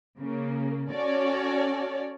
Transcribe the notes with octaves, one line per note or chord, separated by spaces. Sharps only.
C#3 A#3
C#4 F#4 A4 C#5 D5